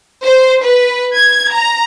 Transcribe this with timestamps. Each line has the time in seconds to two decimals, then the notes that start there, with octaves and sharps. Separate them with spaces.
0.24 C5
0.64 B4
1.16 G#6
1.53 A#5